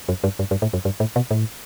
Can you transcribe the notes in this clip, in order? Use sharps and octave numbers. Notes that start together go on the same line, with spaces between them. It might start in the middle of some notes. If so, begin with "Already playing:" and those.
F#2
G2
G2
G2
A2
F#2
G2
A2
B2
A2